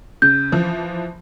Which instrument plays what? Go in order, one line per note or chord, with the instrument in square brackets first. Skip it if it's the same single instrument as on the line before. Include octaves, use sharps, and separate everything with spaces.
[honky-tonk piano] C#3 [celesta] G6
[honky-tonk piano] E3 F3